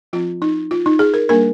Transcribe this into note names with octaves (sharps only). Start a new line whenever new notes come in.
F3 C4 F4
D#4
F4
D#4
G#4
A#4
G3 A#3 D4 A#4